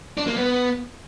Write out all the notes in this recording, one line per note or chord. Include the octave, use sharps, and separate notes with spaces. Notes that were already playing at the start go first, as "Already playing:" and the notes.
D4
A#3
B3